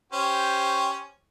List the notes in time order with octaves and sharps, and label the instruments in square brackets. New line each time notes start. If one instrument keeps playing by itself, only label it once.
[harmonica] C#4 G4 C5